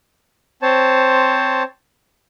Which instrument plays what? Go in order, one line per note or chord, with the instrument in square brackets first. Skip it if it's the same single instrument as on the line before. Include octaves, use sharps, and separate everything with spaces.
[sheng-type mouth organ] C4 C5 C#5 A5